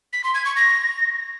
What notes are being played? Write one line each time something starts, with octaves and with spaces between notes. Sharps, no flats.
B6
C6
G#6
C#6
A#6